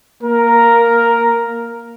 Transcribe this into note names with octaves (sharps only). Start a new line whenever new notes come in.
A#3 A#4